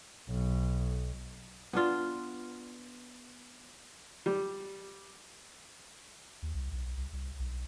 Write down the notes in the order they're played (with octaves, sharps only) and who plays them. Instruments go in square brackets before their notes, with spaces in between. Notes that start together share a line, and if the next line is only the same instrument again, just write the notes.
[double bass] B1
[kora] B3 D4 F4
[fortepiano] G3
[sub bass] D#2
C2
B1
C2
C2
B1